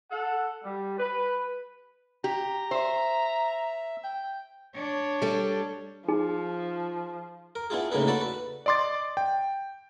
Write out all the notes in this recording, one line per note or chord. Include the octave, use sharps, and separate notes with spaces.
A4 F#5
G3
B4
G4 A#5
C5 E5
G5
D4 C#5
G3 A4
F3 D#4 G#4
A#4
B3 D4 E4 F4 G#4
A2 C#3 A#3 D#4 G#4 B4
F#4 A4 B4 D5 A5 B5
B4
D5 D#5 C6 D6 A6
G5